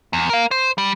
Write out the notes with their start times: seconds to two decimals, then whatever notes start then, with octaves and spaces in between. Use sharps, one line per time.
0.13 E2
0.30 A#4 F5
0.51 C5
0.78 G3